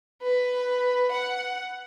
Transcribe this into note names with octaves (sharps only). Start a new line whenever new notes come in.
B4
F#5